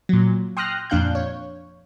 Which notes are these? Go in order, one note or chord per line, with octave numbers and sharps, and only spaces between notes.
A#2 F#3
G5 C6 D#6 F6 F#6 A#6
F2 A#2 D4 F5 F#6 G6
C#5